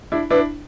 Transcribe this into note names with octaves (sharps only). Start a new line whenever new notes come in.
D4 E4
D4 E4 B4